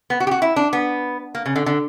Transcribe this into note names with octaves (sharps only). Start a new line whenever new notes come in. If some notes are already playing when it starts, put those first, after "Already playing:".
B3
F#4
G4
F#4
E4
D4
B3
A#3
C#3
D3
D3